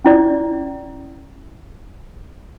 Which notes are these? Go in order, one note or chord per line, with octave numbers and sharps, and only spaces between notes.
C#4 E4 D5